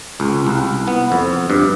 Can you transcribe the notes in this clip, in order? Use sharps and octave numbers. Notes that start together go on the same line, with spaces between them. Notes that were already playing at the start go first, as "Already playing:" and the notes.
C#2
C2
B3
F2
G2